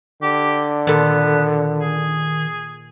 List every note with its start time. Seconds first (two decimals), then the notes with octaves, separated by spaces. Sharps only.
0.22 D3 G4
0.87 A#2 D#3 B3 A4
1.81 G#4